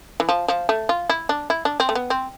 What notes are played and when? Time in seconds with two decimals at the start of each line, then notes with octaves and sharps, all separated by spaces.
0.20 E3
0.29 F3
0.48 F3
0.69 A3
0.89 F4
1.10 E4
1.29 D4
1.50 E4
1.65 D4
1.80 C4
1.89 A3
1.95 B3
2.10 C4